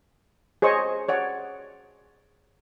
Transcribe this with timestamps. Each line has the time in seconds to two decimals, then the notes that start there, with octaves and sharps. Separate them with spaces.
0.62 G#4 C5 C#5 D#5 C#6
1.08 C#5 D5 F#5